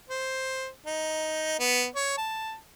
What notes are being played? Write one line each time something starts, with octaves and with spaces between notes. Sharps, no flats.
C5
D#4
B3
C#5
A5